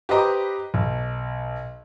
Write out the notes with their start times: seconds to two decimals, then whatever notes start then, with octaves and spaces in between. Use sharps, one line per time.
0.09 G4 B4 C5 D#5 A#5 D6
0.74 B1